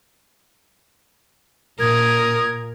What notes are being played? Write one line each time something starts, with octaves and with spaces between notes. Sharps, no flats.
A#2 A#4 D#6 G#6